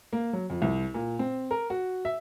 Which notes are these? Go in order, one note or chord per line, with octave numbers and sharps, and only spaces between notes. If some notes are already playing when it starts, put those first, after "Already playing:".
A#3
F#3
F2
C2
A#2
C4
A#4
F#4
E5